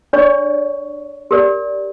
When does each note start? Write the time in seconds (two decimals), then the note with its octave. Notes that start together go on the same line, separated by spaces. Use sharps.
0.13 D4 C#5 D5 C#6
1.31 G4 A#4 D5